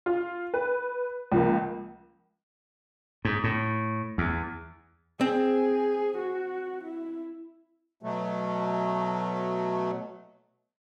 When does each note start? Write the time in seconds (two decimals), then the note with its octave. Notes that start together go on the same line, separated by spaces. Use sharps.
0.06 F4
0.54 B4
1.32 C#2 F3 A#3
3.25 G#2
3.44 A2
4.18 E2
5.21 C4 G#4
6.18 F#4
6.84 E4
8.03 B2 F#3 A3